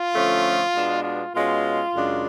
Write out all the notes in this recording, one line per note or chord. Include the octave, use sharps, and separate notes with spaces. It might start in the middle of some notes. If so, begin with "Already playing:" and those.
Already playing: F4
D3 F3 A3 C#4
B2 G#3 B3 D4
F4
B2 G#3 C#4 F4
F#2 C#3 G#3 D4